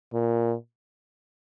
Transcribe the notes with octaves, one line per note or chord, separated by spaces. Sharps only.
A#2